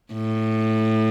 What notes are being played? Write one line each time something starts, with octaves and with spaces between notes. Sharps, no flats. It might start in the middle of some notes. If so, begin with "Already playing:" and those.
A2